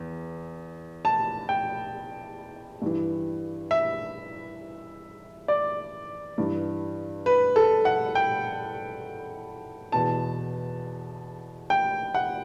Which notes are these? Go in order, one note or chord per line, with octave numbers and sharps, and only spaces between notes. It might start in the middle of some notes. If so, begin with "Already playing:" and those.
Already playing: E2
A5
G5
G2 E3
E5
D5
G2 E3
B4
A4
F#5
G5
E2 B2 A5
G5
F#5